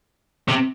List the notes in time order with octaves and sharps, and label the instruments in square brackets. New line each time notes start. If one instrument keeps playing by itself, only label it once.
[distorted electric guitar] C3